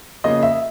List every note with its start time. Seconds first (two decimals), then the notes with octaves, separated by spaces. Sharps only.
0.24 C#3 F3 A#3 D#5
0.43 E5